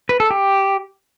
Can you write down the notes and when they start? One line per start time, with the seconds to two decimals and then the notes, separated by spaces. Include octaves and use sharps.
0.09 B4
0.20 A4
0.31 G4